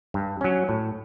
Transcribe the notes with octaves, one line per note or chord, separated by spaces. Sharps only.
G2
F#3 C#4
A2